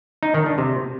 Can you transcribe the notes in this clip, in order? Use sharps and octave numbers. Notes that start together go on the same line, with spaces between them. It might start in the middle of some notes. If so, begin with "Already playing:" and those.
D#4
D#3
D4
C3